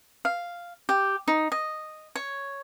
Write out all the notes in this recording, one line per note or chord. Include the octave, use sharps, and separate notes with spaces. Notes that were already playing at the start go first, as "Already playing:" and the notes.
F5
G4
D#4
D#5
C#5